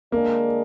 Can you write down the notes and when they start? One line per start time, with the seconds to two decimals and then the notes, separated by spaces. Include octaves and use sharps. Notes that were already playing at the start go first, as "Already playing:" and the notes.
0.12 D3 G#3 A#3 D4 G#4 D5